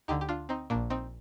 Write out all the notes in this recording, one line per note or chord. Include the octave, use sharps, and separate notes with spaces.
D2 D3 D#4 G4
G4
D4 F4
C4 D#4
A#1 A#2 A#3 D4
C4 D#4